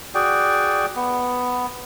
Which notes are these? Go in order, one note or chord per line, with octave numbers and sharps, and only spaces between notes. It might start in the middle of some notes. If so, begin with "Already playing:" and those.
F#4 G#4 D5 G5
B3